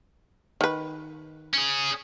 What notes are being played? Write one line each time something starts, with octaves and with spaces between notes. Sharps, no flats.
D#3 B4
C#4 G#4